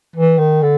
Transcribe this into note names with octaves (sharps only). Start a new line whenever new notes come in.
E3
D#3
D3